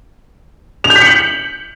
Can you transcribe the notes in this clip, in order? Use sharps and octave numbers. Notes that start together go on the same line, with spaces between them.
F7
G6
B6
C#7
F#7